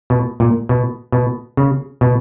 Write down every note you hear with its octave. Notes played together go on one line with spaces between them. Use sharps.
B2
A#2
B2
B2
C#3
B2